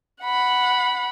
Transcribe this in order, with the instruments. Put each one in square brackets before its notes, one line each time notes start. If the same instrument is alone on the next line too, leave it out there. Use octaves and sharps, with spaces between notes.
[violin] F#5 B5